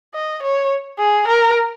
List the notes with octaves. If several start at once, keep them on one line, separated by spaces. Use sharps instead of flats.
D#5
C#5
G#4
A#4